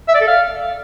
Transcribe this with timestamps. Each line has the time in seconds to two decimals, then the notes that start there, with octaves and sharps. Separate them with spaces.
0.08 E5
0.15 D5
0.21 A4
0.28 F5